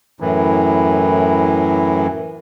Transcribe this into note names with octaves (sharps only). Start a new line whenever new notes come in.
F#2 A2 E3